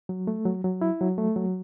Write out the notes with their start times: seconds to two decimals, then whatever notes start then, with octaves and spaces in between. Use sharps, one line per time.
0.09 F#3
0.27 A3
0.45 F#3
0.64 F#3
0.81 E4
1.01 F#3
1.18 A3
1.36 F#3